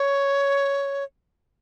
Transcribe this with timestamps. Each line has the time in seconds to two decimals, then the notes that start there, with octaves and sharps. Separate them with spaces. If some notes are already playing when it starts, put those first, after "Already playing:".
Already playing: C#5